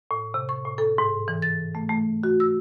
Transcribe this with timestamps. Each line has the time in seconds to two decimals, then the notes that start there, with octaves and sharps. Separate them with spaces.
0.11 A2
0.34 C3
0.49 C#6
0.65 A2
0.78 A4
0.98 G#2
1.28 E3
1.42 A6
1.75 A3
1.89 A3
2.23 F#4
2.40 E6